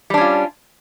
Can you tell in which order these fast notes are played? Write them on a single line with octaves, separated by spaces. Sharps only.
G3 D4 C#4 F4